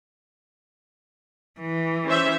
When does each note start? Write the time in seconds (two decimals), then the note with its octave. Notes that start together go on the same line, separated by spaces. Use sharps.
1.60 E3
2.06 C#4 C5 E5